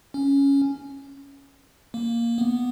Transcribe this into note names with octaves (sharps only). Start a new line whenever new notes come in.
C#4
A#3
B3